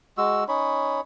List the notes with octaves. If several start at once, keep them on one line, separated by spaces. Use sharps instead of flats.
G#3 F#4 E6
C#4 D#4 C#5 B5